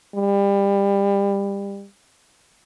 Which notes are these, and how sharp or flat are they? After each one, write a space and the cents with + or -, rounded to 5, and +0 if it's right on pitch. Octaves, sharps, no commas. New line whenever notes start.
G3 +25